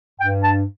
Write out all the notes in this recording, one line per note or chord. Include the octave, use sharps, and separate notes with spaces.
G2 G5
A5